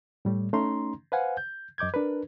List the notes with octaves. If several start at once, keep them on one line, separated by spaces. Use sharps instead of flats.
A2 G3 A3
A3 C#4 D#4 A#5 C6
B4 C5 F5 F#5 G#5
G6
F#2 D#5 D6 G6 G#6
D4 A#4 B4